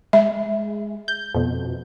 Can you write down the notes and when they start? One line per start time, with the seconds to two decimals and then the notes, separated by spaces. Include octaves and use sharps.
0.13 G#3 E5
1.08 G6
1.35 F2 B2